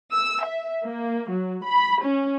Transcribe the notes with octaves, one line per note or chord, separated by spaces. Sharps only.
E6
E5
A#3
F#3
B5
C#4